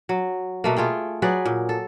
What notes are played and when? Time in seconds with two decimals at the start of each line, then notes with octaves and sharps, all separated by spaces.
0.09 F#3
0.64 B2 A3 A#3
0.76 A3 F4 G#4 G5
1.22 F#3 G#4 B4 D5
1.45 A#2
1.69 A4